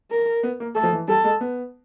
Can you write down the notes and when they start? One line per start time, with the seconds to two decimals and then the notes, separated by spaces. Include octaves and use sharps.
0.11 A#4
0.43 B3
0.60 A#3
0.76 A3 A4
0.83 F3
0.93 E3
1.08 G3 A4
1.24 G#3
1.41 B3